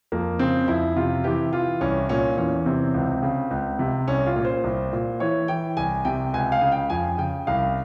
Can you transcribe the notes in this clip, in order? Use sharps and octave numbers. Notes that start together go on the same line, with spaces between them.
F2 A#3
C#3 C4
F2 E4
C3 F4
E3 G4
E3 F4
C2 C#4
A#2 C#4
E2 C#4
C3 C4
C#2
C#3
C#2
C3
C2 C#4
F4
A#2
C5
C2
A#2
E3 C#5
E3 G5
C2 G#5
C3 G5
C#2 G#5
F5
C#3
G5
F2 G#5
C#3 G5
C2 F5